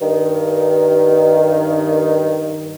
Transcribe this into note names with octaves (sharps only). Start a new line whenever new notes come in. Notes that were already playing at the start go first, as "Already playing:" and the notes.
G2 D#3